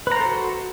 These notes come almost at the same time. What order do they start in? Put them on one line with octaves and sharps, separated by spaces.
B4 A#5 C5 A4 F#4